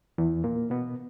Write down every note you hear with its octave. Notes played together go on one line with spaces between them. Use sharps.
E2 E3
A#2 A#3
B2 B3